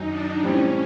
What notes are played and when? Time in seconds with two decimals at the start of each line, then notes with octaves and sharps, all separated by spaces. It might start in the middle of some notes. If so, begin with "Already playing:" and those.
Already playing: F#2 D#3 F#3 D#4
0.09 D4
0.42 A2 E3 G3 C4 C#4